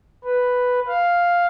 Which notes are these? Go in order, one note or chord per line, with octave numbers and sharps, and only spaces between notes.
B4
F5